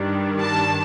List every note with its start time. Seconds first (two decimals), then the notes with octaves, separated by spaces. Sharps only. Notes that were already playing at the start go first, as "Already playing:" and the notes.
Already playing: G2 D#3 G3 D4
0.39 A5